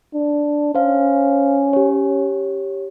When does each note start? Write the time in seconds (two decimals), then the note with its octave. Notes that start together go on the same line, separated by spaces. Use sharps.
0.14 D4
0.75 C#4 C5 F5
1.73 G4 C#5